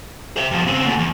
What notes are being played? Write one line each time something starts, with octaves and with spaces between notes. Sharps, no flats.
C5 E5
G2 F3
C#3 C4
D2 A#2
E2